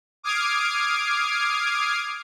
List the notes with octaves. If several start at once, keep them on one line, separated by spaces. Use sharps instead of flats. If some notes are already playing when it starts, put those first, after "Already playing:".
D6 D#6 F6 G#6 C7 D7